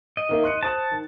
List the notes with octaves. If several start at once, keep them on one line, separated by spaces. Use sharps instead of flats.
D#5
D#3 A#3 E5
C6 F#6 C#7
C5 A5 D#6 F#6
D#3